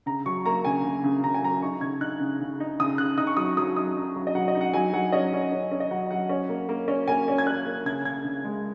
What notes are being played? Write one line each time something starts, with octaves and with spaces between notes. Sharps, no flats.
C#3 A#5
F#3 C#6
A#3 A#5
C#3 G#5
C#3
C#3
C#3 A#5
G#5
F#3 A#5
D#4 C#6
C#3 G#6
D#4 F#6
C#3
C#3
D#4
C#3 D#6
C#3 F#6
D#4 D#6
C#6
F#3 D#6
F#3 D#6
D#4 D#6
D#4
F#3
D#5
F#3 F#5
D#5
D#4
F#5
F#3 G#5
F#3 F#5
C#4 D#5
C#4
C#4
C#4
D#5
F#3 F#5
F#3 F#5
C#4
A#3
A#3
C#4
A#3 G#5
C#4
G#6
C#4 F#6
A#3
C#3 G#6
C#3 G#6
C#3
G#3